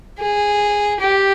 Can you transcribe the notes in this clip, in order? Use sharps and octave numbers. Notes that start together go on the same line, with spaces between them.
G#4
G4